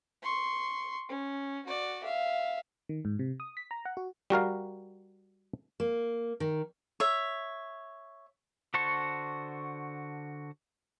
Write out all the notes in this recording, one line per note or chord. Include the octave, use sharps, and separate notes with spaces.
C6 C#6
C#4
F#4 D5
E5 F5
D#3
G#2
C3
D#6
B6
A#5
F#5
F#4
G3 F#4 A#4 F5
A#3
D#3
C#5 E5
D3 F#4 C5 A5 C#6